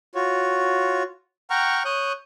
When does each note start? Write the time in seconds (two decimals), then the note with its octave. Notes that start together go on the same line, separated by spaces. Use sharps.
0.15 F4 F#4 C#5
1.50 F#5 G5 A#5 C#6 F6
1.85 C#5 D#6 F#6 G6